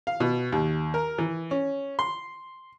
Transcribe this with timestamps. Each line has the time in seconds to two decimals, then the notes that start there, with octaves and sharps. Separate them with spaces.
0.07 F5
0.20 B2
0.52 D#2
0.94 A#4
1.18 E3
1.51 C#4
1.99 C6